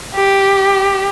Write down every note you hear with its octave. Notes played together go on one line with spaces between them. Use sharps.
G4